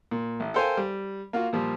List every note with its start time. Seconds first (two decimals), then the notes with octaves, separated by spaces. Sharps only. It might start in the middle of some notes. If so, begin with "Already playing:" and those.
0.11 A#2
0.40 A1
0.54 A4 A#4 C5 F5 G5 G#5
0.77 G3
1.33 A#3 F4 F#4
1.53 A#2 F3 G3